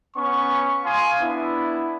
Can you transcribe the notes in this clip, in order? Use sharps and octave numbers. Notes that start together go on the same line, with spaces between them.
B3 C#4 C#6
F4 F5 G#5 C6 D#6
B3 D4 E4